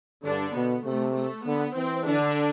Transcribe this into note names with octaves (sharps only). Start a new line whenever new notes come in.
G2 D3 D4
B2 B3
C3 A3
A3
D3 B3
E3 C4
D3 D4